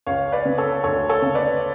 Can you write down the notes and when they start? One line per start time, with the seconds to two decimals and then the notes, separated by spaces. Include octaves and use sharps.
0.07 C#2 C#5 F5
0.32 B4 D5
0.45 C#3
0.58 A4 C#5
0.84 D2 A4 C#5
1.09 A4 C#5
1.22 C#3
1.35 B4 D5